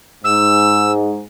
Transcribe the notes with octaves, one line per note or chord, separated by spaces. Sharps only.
G#2 E6